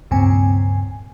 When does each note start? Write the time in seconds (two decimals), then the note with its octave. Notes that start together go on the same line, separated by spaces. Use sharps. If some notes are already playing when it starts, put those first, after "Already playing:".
0.11 C#2 G2 A#2 C#3 C4 G#5